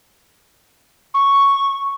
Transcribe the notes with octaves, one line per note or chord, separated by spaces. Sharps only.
C#6